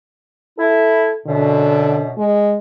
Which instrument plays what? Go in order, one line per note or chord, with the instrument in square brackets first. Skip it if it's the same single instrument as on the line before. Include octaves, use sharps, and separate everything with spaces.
[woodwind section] E4 [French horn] A4
[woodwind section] F#2 B2 [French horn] D3
[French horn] G#3